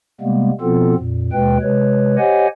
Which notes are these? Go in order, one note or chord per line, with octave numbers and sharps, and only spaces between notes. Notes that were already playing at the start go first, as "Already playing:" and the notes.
C3 G3 G#3 A#3 B3
B2 F3 B3 C4 F4 A4
F2 A#2
D#2 B2 G#3 B4 G5
C3 G#3 B4 C#5
G4 C5 C#5 D#5 F#5 G#5